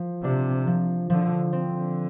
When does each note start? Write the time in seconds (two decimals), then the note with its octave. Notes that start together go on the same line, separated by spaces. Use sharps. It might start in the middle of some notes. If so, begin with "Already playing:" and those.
Already playing: F3
0.24 C3 D4
0.67 F3
1.10 D3 F3
1.53 C4
1.67 D3